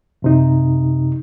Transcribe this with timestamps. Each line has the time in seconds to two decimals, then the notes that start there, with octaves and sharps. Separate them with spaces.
0.22 F#2 C3 D#4